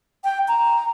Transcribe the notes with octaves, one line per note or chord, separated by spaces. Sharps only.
G5
A#5